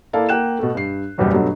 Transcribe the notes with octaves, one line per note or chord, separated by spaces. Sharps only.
A#3 E4 A4 D5 F5 A5
A#3 F#5 G5 F#6 E7
B2 A3
G2 C7
F#1 B1 E2 G3 G4
G2 B2 F#3 A3